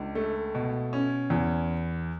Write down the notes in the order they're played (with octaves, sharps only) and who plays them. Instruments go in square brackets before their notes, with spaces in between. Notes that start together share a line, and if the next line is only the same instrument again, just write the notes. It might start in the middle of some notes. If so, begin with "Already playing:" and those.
Already playing: [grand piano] C#2 D4
A3
B2
C#4
E2